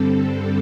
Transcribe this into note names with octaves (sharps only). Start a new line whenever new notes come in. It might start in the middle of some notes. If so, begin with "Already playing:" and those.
Already playing: G2 D3 G3 C4 A4